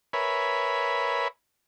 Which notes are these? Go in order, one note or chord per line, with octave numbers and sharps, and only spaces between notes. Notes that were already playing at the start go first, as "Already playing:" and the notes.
A#4 B4 C#5 E5 G#5 B5